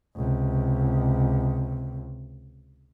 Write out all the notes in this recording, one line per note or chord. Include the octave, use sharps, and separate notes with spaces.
C#2 C3